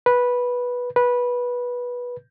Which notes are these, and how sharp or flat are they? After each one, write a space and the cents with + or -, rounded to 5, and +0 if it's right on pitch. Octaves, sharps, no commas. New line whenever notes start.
B4 -10
B4 -15